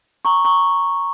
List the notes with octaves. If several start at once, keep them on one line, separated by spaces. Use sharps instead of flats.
A#5 C#6
A#5 C#6